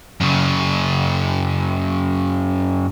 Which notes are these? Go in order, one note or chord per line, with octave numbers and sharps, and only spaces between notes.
F#2 C#3